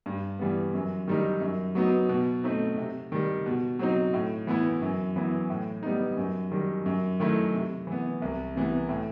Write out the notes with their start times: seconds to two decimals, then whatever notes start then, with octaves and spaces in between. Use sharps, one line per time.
0.06 G2
0.39 E3 G3 B3
0.74 F#2
1.07 D#3 G3 D#4
1.41 F#2
1.75 F#3 B3 D#4
2.09 B2
2.44 A3 C4 D#4
2.78 C3
3.12 D#3 G3
3.46 B2
3.79 F#3 C4 D#4
4.13 A2
4.47 E3 B3 E4
4.82 F#2
5.16 E3 B3 E4
5.50 A2
5.83 G3 B3 D#4
6.17 F#2
6.51 D#3 G3
6.86 F#2
7.20 D#3 A3 E4
7.54 C3
7.87 E3 B3
8.22 C2
8.56 C3 E3 B3
8.89 A2